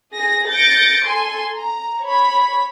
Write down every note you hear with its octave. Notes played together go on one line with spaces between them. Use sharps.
G#4 A#6
G6 A6 A#6 C#7 D7
A4 G#5 C6
A#5
C#5 B5